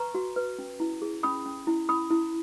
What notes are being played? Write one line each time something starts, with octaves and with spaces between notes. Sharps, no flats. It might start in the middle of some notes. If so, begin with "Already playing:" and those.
Already playing: B4 A#5 C#6
F#4
B4
C#4
E4
G#4
C#4 B5 D#6
C#4
E4
C#4 B5 D#6
E4